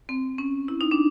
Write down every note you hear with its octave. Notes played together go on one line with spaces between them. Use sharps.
C4
C#4
E4
D#4
D4